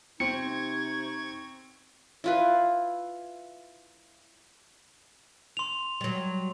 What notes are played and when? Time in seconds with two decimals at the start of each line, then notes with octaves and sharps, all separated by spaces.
0.20 C3 C4 D#4 C#6 G#6 C#7
2.24 E4 F4 B4
5.57 C6 F7
6.01 F#3 G3